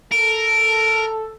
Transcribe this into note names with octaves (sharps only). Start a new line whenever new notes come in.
A4 A#4